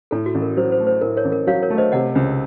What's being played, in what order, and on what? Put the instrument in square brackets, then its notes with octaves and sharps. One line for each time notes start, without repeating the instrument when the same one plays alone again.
[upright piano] A2 [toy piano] A4
[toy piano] F#4
[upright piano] A1
[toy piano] A#4
[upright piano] F#3 [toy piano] C5
[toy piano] C5
[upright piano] A3
[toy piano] C5
[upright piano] A2 [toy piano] A#4
[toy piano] A#4 C#5
[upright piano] A1
[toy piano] A#4
[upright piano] F#3 [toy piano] C#5 F5
[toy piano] A#4 C#5
[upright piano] A3
[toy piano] C5 D#5
[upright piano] C3 [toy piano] D#5 F#5
[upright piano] C#2